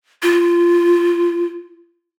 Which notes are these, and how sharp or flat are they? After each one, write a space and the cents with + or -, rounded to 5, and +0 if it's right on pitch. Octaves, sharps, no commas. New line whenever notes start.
F4 -20